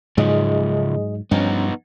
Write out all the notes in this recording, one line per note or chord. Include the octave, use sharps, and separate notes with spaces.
G#2 C#3 F3 F#3 G#4 D#5
G2 F3 B3 C#4 D#4